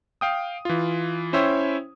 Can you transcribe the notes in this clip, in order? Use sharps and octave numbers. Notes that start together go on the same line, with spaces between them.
F5 G5 D#6
E3 F4
C#4 E4 C5 C#5 E5 G5